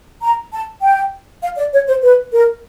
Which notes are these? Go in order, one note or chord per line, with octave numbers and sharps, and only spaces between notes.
A#5
A5
G5
F5
D5
C#5
C5
B4
A#4